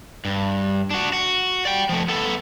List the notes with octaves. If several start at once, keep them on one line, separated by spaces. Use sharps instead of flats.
G2
D4 F#4
F#4
D5 G5
F3 A3
B3 A4